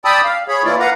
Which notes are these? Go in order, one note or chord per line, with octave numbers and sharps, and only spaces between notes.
D5 G5 A5 B5 D#6 E6
F5
G#4 C#5 B5
E3 A#3 E4 F4 D5
B4 F5 F#5 A#5